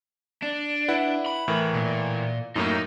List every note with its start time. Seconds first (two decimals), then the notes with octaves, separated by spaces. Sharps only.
0.43 D4
0.88 E4 B4 F#5
1.26 B5
1.48 A2 E3 A#4
1.74 A#2
2.56 F#2 A2 A#3 D#4